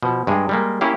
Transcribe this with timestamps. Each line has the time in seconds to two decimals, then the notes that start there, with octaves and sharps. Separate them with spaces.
0.03 B2 F3
0.27 G2 G#3 G#4
0.49 G3 G#3 A#3
0.81 A#3 C#4 E4 G4 F5